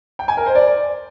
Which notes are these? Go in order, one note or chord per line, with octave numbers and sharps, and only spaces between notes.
G5
G#5
A#4
C5
D5